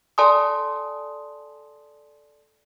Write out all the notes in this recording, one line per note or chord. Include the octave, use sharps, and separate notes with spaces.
A4 D5 G#5 A5 C6 D#6